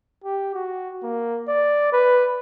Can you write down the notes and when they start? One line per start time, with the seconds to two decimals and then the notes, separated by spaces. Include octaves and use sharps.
0.24 G4
0.55 F#4
1.03 A#3
1.48 D5
1.93 B4